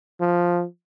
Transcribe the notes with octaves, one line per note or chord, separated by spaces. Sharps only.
F3